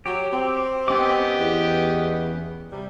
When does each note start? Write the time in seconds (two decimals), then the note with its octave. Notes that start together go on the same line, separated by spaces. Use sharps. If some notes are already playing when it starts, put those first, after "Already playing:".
0.06 F#3 G4
0.32 C4
0.88 B3 C#4 G4 D#5 G5 D6
1.38 E2
2.71 C3 G3